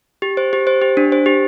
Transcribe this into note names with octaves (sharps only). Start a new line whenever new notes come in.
G4
C5
G4
C5
G4
D4
C5
G4